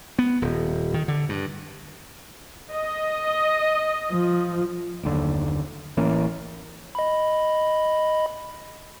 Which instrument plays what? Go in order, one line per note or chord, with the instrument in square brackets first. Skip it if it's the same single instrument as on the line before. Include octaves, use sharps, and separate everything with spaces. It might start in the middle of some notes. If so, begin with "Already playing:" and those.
[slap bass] B3
D#1
D#3
D3
G2
[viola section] D#5
[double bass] F3
[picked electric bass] F#1 D#2 D3
A1 E3 A#3 C#4
[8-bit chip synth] D#5 B5